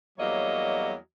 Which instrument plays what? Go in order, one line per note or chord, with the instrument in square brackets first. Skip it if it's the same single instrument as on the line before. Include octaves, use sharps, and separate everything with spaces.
[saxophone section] E2 F#3 G3 A#3 C#5 D#5